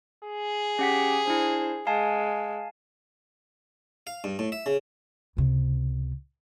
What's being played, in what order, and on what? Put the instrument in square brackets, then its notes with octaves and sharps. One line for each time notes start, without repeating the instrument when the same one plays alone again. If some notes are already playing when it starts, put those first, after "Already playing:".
[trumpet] G#4
[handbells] C#4 F#5 B6 [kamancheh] G4
[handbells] D4 E4 [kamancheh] C5
[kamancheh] G#3 [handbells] F5 G#5 A5
[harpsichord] F5
G2
A2
E5
C#3
[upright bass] C#2 C3